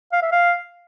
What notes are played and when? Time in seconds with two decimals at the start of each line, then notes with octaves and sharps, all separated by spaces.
0.12 F5
0.22 E5
0.32 F5